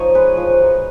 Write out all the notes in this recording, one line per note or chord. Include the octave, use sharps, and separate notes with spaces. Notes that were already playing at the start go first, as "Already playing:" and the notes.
Already playing: F3 D#4 C#5 D#5
G#3 B4
F3
F#3